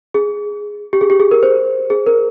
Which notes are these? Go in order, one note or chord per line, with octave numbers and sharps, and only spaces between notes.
G#4
G4
G#4
G4
G#4
A#4
C5
G#4
A#4